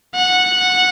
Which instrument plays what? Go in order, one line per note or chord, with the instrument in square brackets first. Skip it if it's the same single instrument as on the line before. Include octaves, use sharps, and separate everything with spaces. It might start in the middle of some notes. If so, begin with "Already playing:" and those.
[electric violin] F#5